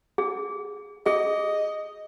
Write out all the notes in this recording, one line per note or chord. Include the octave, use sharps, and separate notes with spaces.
G#4
G#4 D#5